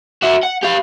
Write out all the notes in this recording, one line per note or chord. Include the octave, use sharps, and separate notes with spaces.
F#4 E5
F#5
G4 F5